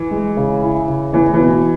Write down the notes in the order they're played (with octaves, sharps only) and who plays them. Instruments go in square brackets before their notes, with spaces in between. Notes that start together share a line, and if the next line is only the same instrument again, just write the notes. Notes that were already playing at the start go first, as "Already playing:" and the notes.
Already playing: [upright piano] E3
[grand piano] G#3
C#3
E4
C#3
[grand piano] E2 [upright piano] E3
[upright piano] E3
[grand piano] B2